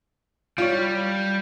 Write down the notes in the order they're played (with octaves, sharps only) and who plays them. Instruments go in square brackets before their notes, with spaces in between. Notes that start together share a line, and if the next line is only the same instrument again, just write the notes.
[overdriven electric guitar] G3 [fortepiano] F4 C#5